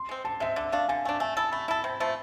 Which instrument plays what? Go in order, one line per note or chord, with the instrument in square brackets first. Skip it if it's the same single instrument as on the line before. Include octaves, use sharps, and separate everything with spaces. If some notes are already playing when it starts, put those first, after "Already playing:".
Already playing: [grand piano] C6
[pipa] G#3 C4
[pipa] D3 [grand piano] A5
[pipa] G#3 C4 [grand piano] E5
[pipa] D3 [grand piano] E5
[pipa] A3 D4 [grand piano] F5
[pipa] D3 [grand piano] G#5
[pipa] A3 D4 [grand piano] G#5
[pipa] A3 [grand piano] G#5
[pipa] E4 A4 [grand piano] A5
[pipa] A3 [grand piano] B5
[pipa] E4 A4 [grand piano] B5
[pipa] C3
F3 A3